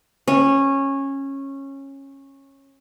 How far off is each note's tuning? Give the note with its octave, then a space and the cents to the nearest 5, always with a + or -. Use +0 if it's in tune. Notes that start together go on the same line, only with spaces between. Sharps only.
C#4 -15